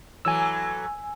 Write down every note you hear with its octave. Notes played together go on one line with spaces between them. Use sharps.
E3 F#3 A3 G#5 E6